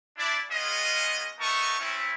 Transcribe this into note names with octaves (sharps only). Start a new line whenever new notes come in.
D4 E4 D5
G#3 B3 C#4 F4 G#4 D#5
A3 B3 D#4 A#4 A5 C#6
A3 C4 C#4 E4